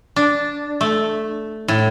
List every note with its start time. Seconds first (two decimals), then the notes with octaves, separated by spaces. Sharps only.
0.16 D4
0.81 A3
1.68 A2